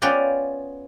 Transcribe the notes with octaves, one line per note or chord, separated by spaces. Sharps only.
B3 C#4 F4 B4 D5 G5